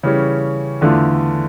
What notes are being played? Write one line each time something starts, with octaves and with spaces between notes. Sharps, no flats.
C#3 E3 G3 C#4
E2 D3 A3 D4 F4